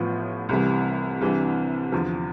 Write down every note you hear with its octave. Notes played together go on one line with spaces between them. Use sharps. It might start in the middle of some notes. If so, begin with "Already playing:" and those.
Already playing: A1 A2 F3 B3 F4
C2 C3 E3 G3
C2 C3 E3 G3 D4
E2 D3 F3